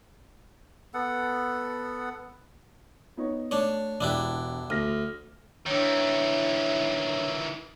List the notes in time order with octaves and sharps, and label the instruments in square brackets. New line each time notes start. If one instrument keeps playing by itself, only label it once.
[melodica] B3 A4 F#5
[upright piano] B3 D#4 C#5
[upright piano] A3 [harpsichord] D4 C#5
[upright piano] E1 F#6 [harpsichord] D4 E4 G4
[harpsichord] D2 [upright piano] F6 A#6
[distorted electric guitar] D#3 E3 [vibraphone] D4 C#5